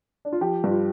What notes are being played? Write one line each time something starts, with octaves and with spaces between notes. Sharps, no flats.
D4
F4
F3 G4
G2
F4